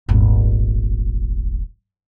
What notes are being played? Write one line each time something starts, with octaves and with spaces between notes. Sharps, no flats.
D#1 G#1